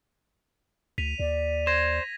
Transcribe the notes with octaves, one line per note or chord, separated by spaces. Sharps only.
D2 B6 D#7 F7
D#2 D5
C5 G#6 A#6